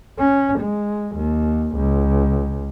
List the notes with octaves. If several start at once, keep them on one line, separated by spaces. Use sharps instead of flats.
C#4
G#3
D#2
C#2